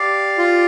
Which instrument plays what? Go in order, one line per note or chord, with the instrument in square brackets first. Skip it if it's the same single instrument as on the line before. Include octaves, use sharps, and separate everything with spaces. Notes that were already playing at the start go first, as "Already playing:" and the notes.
Already playing: [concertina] G4 D5 F5
[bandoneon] F4